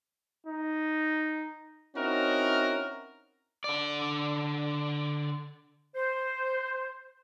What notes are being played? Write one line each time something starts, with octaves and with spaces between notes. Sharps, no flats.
D#4
C4 C#4 D#4 E4 F#4 A#4
D3 D5
C5